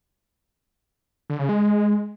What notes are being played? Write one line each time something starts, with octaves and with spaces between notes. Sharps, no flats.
D3
C#3
G#3